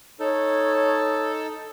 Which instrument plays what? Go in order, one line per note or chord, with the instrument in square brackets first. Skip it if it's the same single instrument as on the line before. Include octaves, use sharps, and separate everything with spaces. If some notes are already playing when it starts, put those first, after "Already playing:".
[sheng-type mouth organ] D#4 A4 [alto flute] C#5